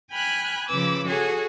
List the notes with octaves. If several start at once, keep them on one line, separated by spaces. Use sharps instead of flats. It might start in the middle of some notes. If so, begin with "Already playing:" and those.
G5 G#5 B5 F6 F#6
C#3 F3 B4 D6 E6
F#4 G#4 A4 C#5 G#5